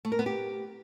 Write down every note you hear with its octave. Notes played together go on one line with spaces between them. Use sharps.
A3
A#4
B3
G4